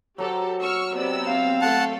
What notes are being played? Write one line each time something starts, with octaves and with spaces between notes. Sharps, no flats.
F#3 G4 A4 C5 A#5
C#6 E6 F6
C3 B3 D5 E6
C4 F5
A3 A4 F#5 A5